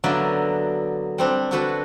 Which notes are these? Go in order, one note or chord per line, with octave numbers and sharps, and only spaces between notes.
D3 F#3 A#3 B3 D5 E5
G3 C4 D4
D3 D4 F#4 A4 B4 B5